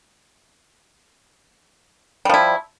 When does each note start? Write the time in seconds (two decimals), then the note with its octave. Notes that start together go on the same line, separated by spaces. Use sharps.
2.25 G3
2.29 F3
2.34 E4